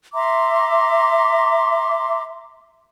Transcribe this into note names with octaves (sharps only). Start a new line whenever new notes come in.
E5 A#5 C6 D6